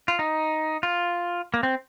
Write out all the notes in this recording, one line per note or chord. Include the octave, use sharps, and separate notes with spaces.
F4
D#4
F4
A#3
C4